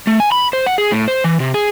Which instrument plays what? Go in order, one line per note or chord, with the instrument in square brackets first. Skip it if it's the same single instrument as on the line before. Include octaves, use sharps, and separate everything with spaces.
[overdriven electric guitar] A3
G#5
B5
C5
F#5
G#4
A2
C5
E3
C3
G#4